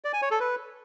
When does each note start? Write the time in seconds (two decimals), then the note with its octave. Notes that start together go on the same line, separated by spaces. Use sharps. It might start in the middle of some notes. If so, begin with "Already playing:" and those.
0.05 D5
0.13 G#5
0.22 C#5
0.31 A4
0.40 B4